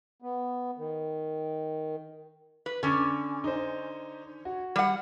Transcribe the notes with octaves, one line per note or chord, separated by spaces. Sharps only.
B3
D#3
B4
D3 C#4 C#6 D6
D#4 C5
F#4
G3 F#5